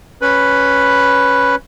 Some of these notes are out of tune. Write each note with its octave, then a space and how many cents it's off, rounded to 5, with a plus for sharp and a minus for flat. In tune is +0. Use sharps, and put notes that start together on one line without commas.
C#4 +0 B4 +0 B5 +0